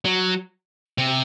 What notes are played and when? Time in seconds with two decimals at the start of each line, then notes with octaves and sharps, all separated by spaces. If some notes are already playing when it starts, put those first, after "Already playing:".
0.05 F#3
0.98 C3